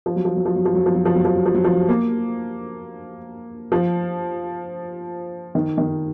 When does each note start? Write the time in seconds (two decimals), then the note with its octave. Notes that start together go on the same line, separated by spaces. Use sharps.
0.06 F3
0.16 F#3
0.25 F3
0.36 F#3
0.45 F3
0.56 F#3
0.65 F3
0.75 F#3
0.86 F3
0.95 F#3
1.05 F3
1.15 F#3
1.25 F3
1.35 F#3
1.46 F3
1.55 F#3
1.64 F3
1.89 A#3
3.72 F3
5.55 D#3
5.78 D#3